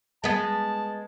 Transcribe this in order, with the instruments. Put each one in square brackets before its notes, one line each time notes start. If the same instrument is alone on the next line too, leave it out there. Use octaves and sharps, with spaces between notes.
[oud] G#3 B3 [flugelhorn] A5